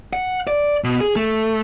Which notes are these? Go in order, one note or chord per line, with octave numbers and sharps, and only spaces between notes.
F#5
D5
B2
G#4
A3